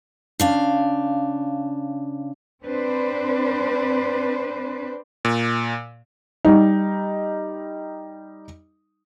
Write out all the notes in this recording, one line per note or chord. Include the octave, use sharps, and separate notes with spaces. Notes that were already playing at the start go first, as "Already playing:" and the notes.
C#3 D4 F5
C4 D4 B4 C5
A#2
G3 D#4